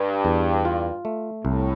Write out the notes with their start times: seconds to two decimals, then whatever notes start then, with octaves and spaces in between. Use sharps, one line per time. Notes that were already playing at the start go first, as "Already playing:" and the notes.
Already playing: G2
0.25 E2
0.65 F4
1.05 A3
1.45 C2 A2